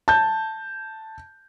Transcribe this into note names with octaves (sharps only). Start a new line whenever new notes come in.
A5 G6